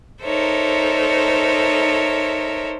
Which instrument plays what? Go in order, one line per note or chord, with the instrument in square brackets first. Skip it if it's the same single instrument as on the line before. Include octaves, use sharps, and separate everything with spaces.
[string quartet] D#4 A4 A#4 C5 C#5 E5